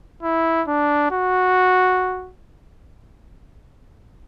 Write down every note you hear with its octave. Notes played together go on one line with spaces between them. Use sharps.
E4
D4
F#4